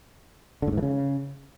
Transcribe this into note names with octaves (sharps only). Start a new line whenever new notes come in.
D3
A2
G#2
E3
C#3